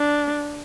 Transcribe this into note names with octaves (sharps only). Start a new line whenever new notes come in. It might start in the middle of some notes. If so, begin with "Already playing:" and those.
Already playing: D4